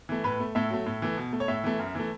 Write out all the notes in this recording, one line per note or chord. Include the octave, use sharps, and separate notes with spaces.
E3 A3
A2 B4
A3
A2 E5
F#3 A3
A2
E3 A3
B2
A3
C#5
A2 E5
E3 A3
F#2
E3 A3